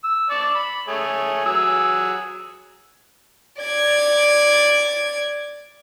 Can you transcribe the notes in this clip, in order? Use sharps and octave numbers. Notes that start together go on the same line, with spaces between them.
E6
D5 A5 C#6
B5
A3 G#4 C#5
F#3 G#4 E6
D5 G#6